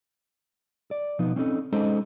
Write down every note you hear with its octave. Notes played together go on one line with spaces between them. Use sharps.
D5
B2 F3 B3 D#4
C4 C#4 D#4 A4
G#3 C#4 D#4 A4 C5 D#5